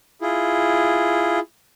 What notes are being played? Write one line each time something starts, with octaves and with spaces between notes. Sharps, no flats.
E4 F4 G#4